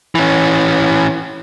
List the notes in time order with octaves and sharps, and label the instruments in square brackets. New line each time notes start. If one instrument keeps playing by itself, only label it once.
[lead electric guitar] E3 C#4